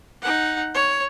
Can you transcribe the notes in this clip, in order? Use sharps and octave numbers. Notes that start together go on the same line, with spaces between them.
D#4 F#5
C#5